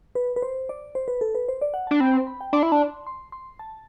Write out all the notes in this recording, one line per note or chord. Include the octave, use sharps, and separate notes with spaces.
B4
B4
C5
D5
C5
B4
A4
B4
C5
D5
F#5
D4 A5
C4 B5
C6
B5
G5
D4 C6
E4
D4
C6
C6
A5